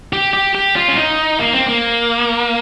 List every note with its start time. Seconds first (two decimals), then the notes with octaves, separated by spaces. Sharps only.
0.13 G4
0.33 G4
0.55 G4
0.76 F4
0.88 C#4
0.97 D#4
1.39 A#3
1.53 C4
1.66 A#3